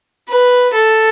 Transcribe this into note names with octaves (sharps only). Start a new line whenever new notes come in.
B4
A4